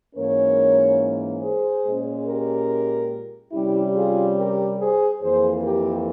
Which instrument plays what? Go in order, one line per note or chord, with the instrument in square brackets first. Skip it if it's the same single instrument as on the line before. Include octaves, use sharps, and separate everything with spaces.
[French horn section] G#2 E3 A#3 C#4 A#4 C#5
G#4 C5
A#2 G#3 C#4
G4 A#4
C3 G3 C#4 E4 G4
F4 G#4
G4 A#4
G#4 C5
F2 E3 A#3 G#4 C5
G4 A#4